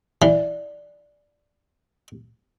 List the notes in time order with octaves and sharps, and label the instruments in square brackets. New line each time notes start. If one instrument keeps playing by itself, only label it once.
[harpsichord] E3 [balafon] D5